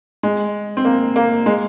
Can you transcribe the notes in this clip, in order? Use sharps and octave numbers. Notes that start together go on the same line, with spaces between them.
G#3
C4
A#3
A#3
G#3